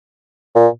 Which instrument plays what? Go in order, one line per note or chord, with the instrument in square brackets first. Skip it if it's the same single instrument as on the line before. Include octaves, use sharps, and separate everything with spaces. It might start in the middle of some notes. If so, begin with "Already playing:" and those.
[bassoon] A#2